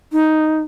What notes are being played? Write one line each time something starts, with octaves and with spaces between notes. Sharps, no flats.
D#4